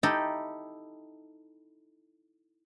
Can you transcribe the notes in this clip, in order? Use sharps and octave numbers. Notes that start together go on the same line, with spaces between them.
D#4 E4 G4 A4